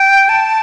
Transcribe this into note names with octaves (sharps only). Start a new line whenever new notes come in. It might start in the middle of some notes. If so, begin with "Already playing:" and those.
Already playing: G5
A5